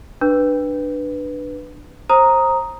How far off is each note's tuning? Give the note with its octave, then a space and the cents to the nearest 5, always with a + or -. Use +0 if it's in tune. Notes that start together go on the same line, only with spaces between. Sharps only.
D4 +15 B4 +0
C5 +20 A#5 +0 D#6 +5